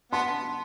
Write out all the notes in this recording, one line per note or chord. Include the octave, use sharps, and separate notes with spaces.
B3 A5 C6